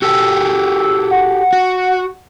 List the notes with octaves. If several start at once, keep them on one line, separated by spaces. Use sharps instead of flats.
F#4 G4 A4 E6
F#5
F#4